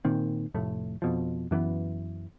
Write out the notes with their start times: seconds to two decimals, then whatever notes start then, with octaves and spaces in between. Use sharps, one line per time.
0.05 A#2 D#3 C4
0.54 F1 A2 A3
1.02 F2 B2 F3
1.51 F#2 E3 A3 B3